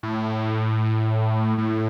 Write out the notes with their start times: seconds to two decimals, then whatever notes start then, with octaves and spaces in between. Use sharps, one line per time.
0.03 A2
1.58 A2